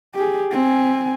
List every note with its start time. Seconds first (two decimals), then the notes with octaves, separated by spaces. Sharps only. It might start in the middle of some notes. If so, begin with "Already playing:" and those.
0.15 G4 G#4
0.52 C4 G#5